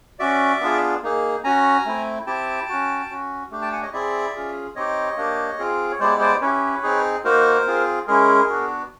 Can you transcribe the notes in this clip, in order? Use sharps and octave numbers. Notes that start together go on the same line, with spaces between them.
C#4 F#4 D5 E5
B3 D4 F4 G#4
A#3 D#4 G#4
C#4 F#4 G#5 A#5
A3 C4 E4
C4 E4 G4 G5 A5
C#4 F#4
C#4 F#4
A3 D4 G4
G5 A5
F#5 G#5
C#5 D#5
C4 E4 G#4 D5 E5
C#4 F4 G#4
C4 D#4 G4 C#5 D#5
A#3 D4 G4
C4 F4 G#4
C#5
G#3 B3 E4 G4 C5 D5
C5 D5
C#4 E4 G4 B4 C#5
C4 D#4 G#4
A#3 D#4 F#4 A#4 C5
C4 F4 G#4
G#3 C#4 E4 G#4 A#4
B3 D4 F#4